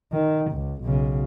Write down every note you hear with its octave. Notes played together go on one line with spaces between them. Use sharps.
D#3
C#2
B1 C#3